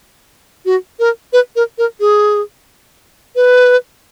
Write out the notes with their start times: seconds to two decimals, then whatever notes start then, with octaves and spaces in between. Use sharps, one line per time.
0.65 F#4
0.99 A#4
1.33 B4
1.56 A#4
1.78 A#4
2.00 G#4
3.36 B4